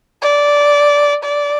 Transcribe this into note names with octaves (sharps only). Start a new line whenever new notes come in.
D5
D5